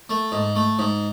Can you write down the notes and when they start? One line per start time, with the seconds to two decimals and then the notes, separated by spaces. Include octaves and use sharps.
0.09 A3
0.32 G#2
0.56 A3
0.79 G#2